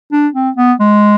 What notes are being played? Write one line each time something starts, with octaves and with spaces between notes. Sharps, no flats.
D4
C4
B3
G#3